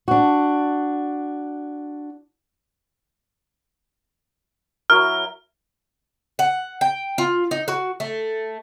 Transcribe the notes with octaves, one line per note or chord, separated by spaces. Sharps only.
D4 F#4
F#3 E4 A#4 F6
F#5
G5
F4
D#4
F#4
A3